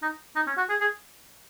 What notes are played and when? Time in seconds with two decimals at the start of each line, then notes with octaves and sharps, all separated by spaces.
0.03 D#4
0.36 D#4
0.47 C#4
0.57 F#4
0.69 G#4
0.81 G#4